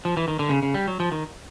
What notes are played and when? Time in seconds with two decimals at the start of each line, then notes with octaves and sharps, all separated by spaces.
0.05 F3
0.17 E3
0.28 D#3
0.39 D3
0.49 C#3
0.63 C#3
0.74 G3
0.88 F#3
1.00 F3
1.12 D#3